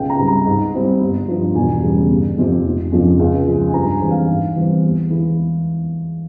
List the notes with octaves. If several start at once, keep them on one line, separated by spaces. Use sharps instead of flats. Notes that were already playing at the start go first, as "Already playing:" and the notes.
Already playing: C#2 G5
A#5
C3 G3
A#5
G#2
G3 C4 E4
G1
G2 F3
E1 G#5
E2 C#3 G3
G1
F2 C3 F3
F1
F2 C#3 F3 G#3
C#2
C#3 F3 G#3
G#5
G2 A#5
G#5
E3 G#3 C4
F5
G#2
E3 G3 C4
E2
E3 G#3 E4